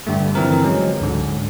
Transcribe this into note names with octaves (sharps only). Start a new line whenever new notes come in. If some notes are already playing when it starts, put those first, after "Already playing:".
G2 D3 G3 A3
D3 E3 F3 C4 A#4
F#3 G#3 C#4
D2 G#2 D3